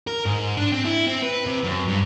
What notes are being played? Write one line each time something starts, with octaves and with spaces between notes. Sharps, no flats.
A#4
G#2
D4
C4
E4
C4
B4
C3
F#2
G2